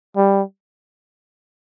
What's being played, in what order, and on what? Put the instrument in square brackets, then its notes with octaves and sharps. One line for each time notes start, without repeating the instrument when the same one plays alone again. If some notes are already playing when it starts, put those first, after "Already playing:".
[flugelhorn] G3